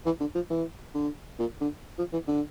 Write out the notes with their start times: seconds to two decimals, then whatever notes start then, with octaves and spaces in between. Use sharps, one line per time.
0.06 E3
0.20 D3
0.35 F3
0.50 E3
0.95 D3
1.39 A#2
1.61 D3
1.98 F3
2.13 E3
2.28 D3